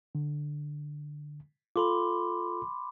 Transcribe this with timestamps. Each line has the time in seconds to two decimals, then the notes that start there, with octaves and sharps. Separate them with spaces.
0.15 D3
1.76 F4 A4 B5 C6 D6